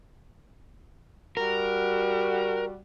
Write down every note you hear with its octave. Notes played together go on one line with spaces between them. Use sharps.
G3 F#4 A#4